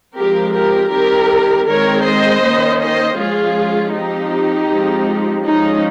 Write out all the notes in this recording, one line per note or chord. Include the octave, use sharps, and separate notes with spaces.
F3 G#3 C4 G4 A#4
G4 A#4
D#3 G3 C4 G4 A#4
D#3 G#3 C4 A#4 C#5
C5 D#5
D#3 A#3 C#4
C5 D#5
F3 G#3 C#4 F4 G#4
F3 C4 D#4 G4
F3 G#3 C4
F3 G#3 C#4 D#4